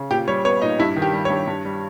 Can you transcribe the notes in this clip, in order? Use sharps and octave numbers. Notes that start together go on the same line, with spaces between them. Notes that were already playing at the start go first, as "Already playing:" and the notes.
Already playing: C#3
A#2 G4
G3 C#5
B3 C#5
A#2 D#4
G2 E4
D#3
G4
G3
G2 C#5
G2
G3